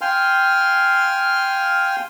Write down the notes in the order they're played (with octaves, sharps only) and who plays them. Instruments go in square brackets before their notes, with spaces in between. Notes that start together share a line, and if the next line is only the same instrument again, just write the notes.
[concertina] F5 G5 G#5 C6 F6